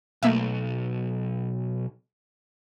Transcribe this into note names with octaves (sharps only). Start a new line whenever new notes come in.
B1 A3 A#3 E5